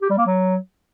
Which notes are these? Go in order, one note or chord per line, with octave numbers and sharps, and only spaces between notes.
G4
G3
A#3
F#3